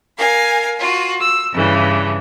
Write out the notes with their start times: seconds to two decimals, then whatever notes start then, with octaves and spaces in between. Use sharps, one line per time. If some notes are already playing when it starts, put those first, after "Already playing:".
0.17 A#4 F5 G#5
0.78 F4 F#4
1.20 E6
1.52 G2 C#3 E3